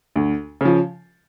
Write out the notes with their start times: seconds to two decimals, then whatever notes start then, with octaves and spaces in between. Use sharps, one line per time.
0.16 D2
0.61 C#3 F3